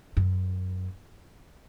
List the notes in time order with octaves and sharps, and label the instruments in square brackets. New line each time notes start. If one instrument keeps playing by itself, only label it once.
[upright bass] F#2